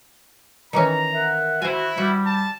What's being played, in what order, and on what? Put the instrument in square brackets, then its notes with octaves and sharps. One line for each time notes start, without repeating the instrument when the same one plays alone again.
[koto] D#3 E3 C#4 [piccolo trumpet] A#5
[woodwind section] A#4 E5 F#5
[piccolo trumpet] E4 [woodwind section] F#4 [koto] C5 G#5
[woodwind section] G3 [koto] F#4
[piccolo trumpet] A5